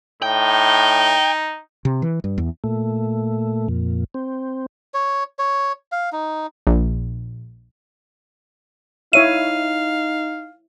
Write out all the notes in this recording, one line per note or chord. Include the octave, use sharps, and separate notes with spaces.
A2 D#4 G5
C3
E3
G2
E2
A#2 A3
F2 A#2
C4
C#5
C#5
F5
D#4
A#1
D#4 E4 C#5 E5 F5 D#7